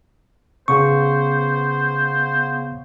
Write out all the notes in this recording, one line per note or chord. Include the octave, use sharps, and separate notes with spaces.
C#3 B3 C5 C#6